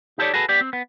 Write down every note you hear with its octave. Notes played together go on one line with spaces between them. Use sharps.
D#4 G4 A4 A#4 C#5 D5
F#4 G#4 A4 B4
B3 G4 D5
C4
B3